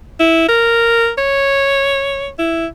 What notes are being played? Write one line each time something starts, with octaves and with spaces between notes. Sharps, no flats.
E4
A#4
C#5
E4